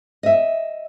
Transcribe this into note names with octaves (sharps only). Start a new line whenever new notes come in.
D#5 E5